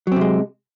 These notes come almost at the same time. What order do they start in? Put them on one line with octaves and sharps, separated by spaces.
F#3 C4 C3 G#3